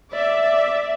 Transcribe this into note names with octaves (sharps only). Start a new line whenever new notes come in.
D5 E5